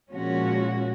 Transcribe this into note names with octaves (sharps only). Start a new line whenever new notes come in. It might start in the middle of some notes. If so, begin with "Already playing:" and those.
A#2 F3 G#3 C#4 F#4